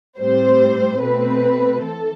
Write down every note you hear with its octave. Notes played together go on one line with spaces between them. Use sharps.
A2 G3 C4 C5
B2 A3 C4 B4
E3 A4